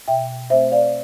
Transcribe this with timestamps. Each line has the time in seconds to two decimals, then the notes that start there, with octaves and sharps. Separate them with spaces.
0.08 B2 E5 G5
0.50 A3 C4 C5 E5
0.72 D5 F5